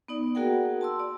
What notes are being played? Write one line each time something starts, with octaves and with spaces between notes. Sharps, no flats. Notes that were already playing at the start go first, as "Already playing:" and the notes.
B3 D#4 D5
A#3 F#4 G#4 A#4 F#5 G5
A5 C6 E6
D5